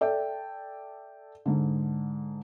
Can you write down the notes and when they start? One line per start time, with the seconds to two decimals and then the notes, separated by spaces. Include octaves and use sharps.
0.01 A4 D5 E5 G5
1.46 G#2 D3